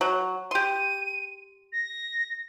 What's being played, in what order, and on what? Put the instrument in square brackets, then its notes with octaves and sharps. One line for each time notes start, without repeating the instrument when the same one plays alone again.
[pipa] F#3
[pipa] G4 C6 [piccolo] D#7
[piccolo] A#6